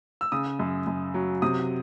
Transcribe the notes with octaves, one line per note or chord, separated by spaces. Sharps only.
E6
C#3 D#6
F#2
F#2
F#3
C3 D#6